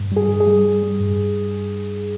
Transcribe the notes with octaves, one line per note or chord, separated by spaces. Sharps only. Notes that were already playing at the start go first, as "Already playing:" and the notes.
Already playing: G2
G3 G#4
G2
G#4
G3
G3
G3
G2